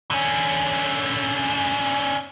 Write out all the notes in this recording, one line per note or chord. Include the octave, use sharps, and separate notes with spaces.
D3 C#4